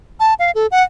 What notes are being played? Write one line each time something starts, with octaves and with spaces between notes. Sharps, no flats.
A5
F5
A4
F#5